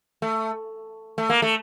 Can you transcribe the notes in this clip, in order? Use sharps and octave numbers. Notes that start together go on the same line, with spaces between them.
A3
A3
A#3
A3